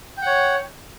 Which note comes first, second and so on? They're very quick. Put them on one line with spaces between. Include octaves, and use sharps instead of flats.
G5 F#5 C#5